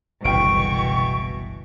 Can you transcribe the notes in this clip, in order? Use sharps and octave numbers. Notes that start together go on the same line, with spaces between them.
F#1 C2 B2 D3 E3 G5 C#6 D7